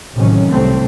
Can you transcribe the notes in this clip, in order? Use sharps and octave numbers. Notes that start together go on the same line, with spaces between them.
A1 A2 C3 D#3 F#3 C#4
C2 A2 A3 C4